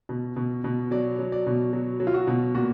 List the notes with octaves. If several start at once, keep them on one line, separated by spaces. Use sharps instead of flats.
B2
B2
B2
F#3 D5
F#3
D5
B2
F#3
F#3
F4
F#4
B2
A#2 F#4